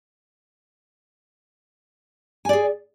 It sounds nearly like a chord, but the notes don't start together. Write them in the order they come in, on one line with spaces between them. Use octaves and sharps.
G#5 D5 G#4